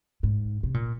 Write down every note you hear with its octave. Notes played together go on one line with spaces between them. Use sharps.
G#2
C3
A#2